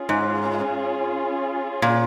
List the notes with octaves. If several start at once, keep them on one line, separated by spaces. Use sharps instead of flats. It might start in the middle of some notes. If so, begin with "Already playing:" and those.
Already playing: C#4 F4 G#4
G#2
A#2